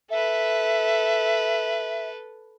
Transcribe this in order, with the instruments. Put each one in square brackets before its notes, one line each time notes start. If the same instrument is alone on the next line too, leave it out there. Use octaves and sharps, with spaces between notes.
[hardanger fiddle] A4 B4 [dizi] E5